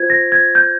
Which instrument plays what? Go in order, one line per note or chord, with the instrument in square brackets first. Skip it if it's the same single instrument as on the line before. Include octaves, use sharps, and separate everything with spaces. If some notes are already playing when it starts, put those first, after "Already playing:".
Already playing: [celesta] F4 C5 G#6
A#6
G#6
G6